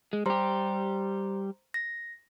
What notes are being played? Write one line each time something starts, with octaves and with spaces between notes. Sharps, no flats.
G#3
G3 G4 C5 A#5 C6
A#6